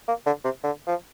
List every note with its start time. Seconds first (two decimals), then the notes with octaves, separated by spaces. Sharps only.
0.08 A#3
0.26 D3
0.44 C3
0.64 D3
0.87 F3